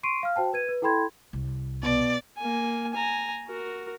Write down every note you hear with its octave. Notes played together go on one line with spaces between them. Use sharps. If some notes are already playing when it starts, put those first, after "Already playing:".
C6 C#6 C7 D7 D#7
F5 F6
F#4 C5 G5 A5
B4 G#6 D#7
B4
E4 A4 G5 B5 C6 G#6
C2
B2 D5
A#3 G#5
G#5 A#5
F#4 A#4